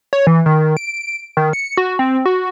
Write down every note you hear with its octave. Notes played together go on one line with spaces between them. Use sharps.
C#5
E3
D#3
D7
D#3
C#7
F#4
C4
F#4